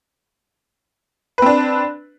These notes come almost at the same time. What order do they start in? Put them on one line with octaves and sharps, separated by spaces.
B4 C4 D4